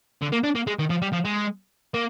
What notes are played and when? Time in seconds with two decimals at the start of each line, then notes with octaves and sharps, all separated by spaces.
0.22 D3
0.32 A#3
0.43 D4
0.55 A#3
0.67 G#3
0.79 D#3
0.90 F3
1.02 G3
1.13 F3
1.25 G#3
1.94 A#3